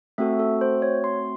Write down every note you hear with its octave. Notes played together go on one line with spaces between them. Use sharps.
A3 C4 F#4 A4 E5
A4
C5
C#5
C6